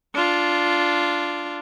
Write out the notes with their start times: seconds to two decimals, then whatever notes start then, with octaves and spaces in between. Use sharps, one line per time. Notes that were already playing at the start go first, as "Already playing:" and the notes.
0.14 D4 F4